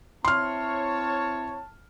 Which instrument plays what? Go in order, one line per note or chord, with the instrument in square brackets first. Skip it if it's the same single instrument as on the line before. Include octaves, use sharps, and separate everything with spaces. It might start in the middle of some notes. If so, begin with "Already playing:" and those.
[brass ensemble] C4 E4 C#5 [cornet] A5 [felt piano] C6 F6